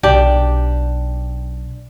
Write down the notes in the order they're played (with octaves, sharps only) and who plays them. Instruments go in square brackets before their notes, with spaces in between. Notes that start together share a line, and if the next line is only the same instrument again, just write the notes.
[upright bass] B1 [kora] D4 G4